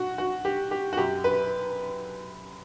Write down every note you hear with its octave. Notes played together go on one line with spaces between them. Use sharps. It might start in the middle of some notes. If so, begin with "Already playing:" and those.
Already playing: F#4
F#4
G4
G4
F#4
F#2 F#3 G4
B4